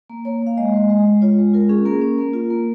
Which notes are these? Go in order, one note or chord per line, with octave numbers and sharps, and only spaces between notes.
A#3
A#3 C#5
A#3 F5
G#3 D#5
G#3
G#3
G#3
F4 C#5
G#3
F4 A#4
C#4 G#4
A#3 A#4
C#4
A#3
F4
A#3